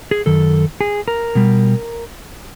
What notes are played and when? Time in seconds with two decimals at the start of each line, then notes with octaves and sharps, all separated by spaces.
0.11 G#4
0.26 F#2 D#3 A4
0.81 G#4
1.08 A#4
1.35 B2 G3